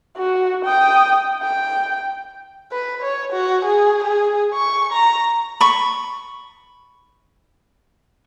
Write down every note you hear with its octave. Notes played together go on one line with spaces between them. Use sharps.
F#4
G5 D#6
G5
B4
C#5
F#4
G#4
G#4
C#6
A#5
B5 C#6